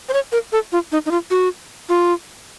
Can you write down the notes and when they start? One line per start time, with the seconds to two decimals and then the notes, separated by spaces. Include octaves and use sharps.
0.09 C5
0.13 C#5
0.32 A#4
0.52 A4
0.72 F4
0.92 D#4
1.06 D#4
1.11 F4
1.31 F#4
1.89 F4